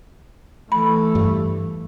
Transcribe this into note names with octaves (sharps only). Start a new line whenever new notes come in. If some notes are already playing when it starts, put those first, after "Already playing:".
E3 A3 B5
G2